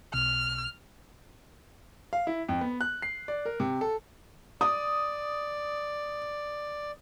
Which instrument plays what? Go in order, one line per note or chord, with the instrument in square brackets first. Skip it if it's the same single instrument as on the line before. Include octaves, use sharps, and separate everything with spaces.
[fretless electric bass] B1 [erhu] F6
[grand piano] F5
E4
F2
B3
F#6
C7
D5
A#4
C3
A4
[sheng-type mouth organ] D5 [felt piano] D#6